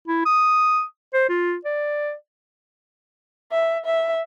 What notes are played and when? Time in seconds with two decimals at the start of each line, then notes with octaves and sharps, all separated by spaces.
0.08 E4
0.25 D#6
1.14 C5
1.29 F4
1.65 D5
3.52 E5
3.86 E5